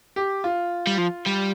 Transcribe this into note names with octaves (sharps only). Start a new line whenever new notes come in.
G4
F4
G3
F3
G3